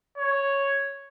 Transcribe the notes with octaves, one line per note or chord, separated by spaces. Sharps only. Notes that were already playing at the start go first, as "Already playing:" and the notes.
C#5